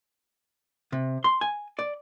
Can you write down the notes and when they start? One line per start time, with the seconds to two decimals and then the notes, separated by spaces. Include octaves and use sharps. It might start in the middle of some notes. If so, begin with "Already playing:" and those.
0.92 C3
1.24 C6
1.41 G#5
1.79 D5